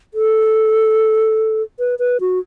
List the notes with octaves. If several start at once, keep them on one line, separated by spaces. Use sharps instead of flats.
A4
B4
B4
F#4